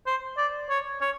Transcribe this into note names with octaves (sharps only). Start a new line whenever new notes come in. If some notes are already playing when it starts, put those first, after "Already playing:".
C5
D5
C#5
C#5